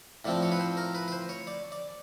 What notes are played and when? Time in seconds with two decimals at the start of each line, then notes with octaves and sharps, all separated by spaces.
0.25 A2 F3 A3 C4 D5
0.42 C#5
0.52 B4
0.60 C5
0.77 A#4
0.95 B4
1.08 B4
1.12 C5
1.29 C#5
1.47 D5
1.72 D5